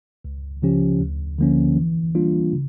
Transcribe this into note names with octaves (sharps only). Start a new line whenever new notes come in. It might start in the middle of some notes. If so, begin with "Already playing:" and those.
C#2
C#3 F3 C#4 G4
D2
D3 F3 A#3 C#4
E3
G3 A#3 D4 F4
C#3